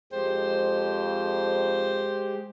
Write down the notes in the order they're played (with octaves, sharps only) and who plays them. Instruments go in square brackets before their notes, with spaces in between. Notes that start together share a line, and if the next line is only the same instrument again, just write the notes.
[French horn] F2 [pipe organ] G#3 G4 [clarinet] C5